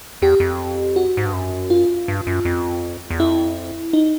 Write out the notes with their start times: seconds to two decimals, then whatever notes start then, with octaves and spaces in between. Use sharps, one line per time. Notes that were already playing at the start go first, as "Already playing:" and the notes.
0.22 E2 G4
0.40 F2
0.96 F#4
1.17 G#2
1.25 G2
1.33 F#2
1.70 F4
2.08 G2
2.27 F#2
2.45 F2
3.10 E2
3.19 F2 E4
3.93 D#4